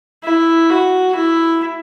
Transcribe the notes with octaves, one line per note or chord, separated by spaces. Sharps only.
E4
F#4
E4